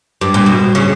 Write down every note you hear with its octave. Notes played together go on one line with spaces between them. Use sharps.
G2
A#2
B2
C#3